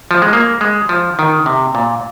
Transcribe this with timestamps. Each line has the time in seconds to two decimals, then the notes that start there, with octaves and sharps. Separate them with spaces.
0.11 F3
0.22 G#3
0.33 A#3
0.61 G#3
0.89 F3
1.19 D#3
1.46 C3
1.75 A#2